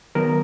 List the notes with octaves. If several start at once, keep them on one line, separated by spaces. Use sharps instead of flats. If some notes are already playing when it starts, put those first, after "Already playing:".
D#3 F#3 B3 A#4